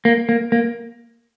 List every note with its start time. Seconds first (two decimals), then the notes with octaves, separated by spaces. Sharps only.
0.05 A#3
0.29 A#3
0.52 A#3